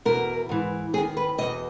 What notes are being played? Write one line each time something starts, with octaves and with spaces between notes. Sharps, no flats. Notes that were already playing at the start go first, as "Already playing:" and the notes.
E2 B2 A#4
G#2 E3
D#2 D#3 G#4
B4
E2 B2 D#5